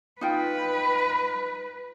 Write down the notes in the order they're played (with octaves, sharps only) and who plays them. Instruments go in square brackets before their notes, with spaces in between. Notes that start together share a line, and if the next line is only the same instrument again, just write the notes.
[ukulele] D#4 F4 G5 [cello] B4